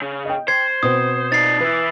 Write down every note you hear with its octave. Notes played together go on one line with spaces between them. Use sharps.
C#3
D#5 G5
C5 G#6 C7
B2 B3 C4 D#6
D#4 D5 A6 C7
E3 E4 B4